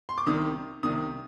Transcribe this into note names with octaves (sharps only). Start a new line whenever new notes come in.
C6
D6
C2 C3 D#3 D#6
C2 C3 D#3 D#6